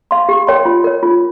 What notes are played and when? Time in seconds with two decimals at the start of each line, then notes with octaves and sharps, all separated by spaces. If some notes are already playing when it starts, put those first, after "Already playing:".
0.11 F5 C6
0.29 G4
0.47 A#4 C#5 G5 C6
0.65 F4
0.84 A#4 C#5
1.03 F4